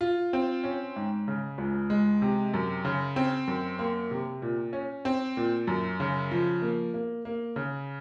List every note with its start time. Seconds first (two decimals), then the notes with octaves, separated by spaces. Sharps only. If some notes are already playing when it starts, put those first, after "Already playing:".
0.01 F4
0.33 C4
0.64 C#4
0.96 G#2
1.28 C#3
1.58 C#2
1.90 G#3
2.22 C3
2.54 F#2
2.85 C#3
3.16 C4
3.48 F#2
3.79 A#3
4.11 C3
4.42 A#2
4.73 C#4
5.05 C4
5.37 A#2
5.67 F#2
6.00 C#3
6.31 F3
6.62 A#3
6.94 A#3
7.25 A#3
7.56 C#3